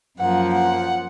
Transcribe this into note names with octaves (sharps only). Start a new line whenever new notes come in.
F#2 F3 A#3 F#5
F#5